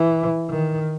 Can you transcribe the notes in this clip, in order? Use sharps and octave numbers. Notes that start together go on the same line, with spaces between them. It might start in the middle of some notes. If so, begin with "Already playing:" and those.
Already playing: E3
D#3